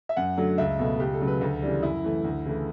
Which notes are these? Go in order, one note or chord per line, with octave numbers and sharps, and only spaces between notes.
E5
F#2 F#5
D3 F#3 A3
C#2 E5
B2 A3
C#2 G4
A4
C#3 F#3 A3
B4
D2 A4
C#3 E3 G3
F#2 E4
E3 A3
D2
C#3 E3 A3